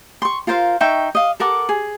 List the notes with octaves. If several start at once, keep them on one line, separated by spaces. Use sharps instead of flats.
C6 C#6
F4 A#4 C5 F5
D#4 E5 G5 C#6
D#5 F5
A4 A#4 F#5 D6
G#4